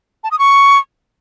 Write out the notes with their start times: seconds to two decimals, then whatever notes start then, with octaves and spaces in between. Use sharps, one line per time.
0.24 A5
0.31 D#6
0.39 C#6